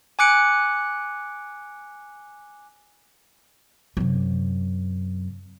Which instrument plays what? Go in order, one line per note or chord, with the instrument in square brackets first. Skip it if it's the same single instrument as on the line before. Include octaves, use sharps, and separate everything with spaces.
[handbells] G#5 D6 F#6 C#7 D7
[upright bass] F#2 C3